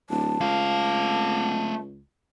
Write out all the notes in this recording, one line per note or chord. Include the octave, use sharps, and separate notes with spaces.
D1 A5
C#2 A3 F5